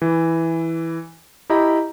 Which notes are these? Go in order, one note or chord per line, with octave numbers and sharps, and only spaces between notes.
E3
E4 G4 D#5 A#5 B5